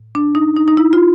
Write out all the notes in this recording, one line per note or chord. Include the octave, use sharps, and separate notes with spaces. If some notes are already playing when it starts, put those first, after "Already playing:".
Already playing: A2
D4
D#4
D#4
D#4
E4
F4